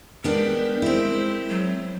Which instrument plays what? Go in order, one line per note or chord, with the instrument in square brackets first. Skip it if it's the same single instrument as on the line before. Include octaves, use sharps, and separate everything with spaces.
[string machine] G#3 G6 B6 [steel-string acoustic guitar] B3 D4 G4 [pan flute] A#4
[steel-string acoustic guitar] C4 E4
[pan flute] F#3